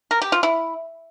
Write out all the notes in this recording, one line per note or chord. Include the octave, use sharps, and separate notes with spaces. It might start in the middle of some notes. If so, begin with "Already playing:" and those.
A#4
G4
F4
E4